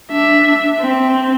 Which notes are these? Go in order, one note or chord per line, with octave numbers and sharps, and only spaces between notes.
D4 E5
C4